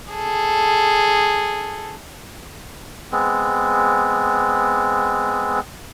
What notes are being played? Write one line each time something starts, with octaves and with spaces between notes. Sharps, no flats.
G#4 A4
G#3 B3 C4